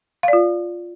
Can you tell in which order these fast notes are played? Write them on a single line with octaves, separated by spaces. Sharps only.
F5 D5 F4